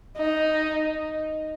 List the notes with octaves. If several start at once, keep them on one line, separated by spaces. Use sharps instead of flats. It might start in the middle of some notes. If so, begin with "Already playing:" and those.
D#4